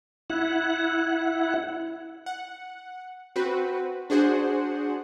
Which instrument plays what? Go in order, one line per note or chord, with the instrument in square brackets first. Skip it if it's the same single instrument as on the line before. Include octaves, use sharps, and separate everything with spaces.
[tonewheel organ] E4 F#5
[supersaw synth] F#5
C4 F#4 B4
D4 F#4 G#4 C5 F#5